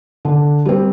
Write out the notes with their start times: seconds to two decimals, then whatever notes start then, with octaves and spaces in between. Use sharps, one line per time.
0.25 D3
0.65 G3 C4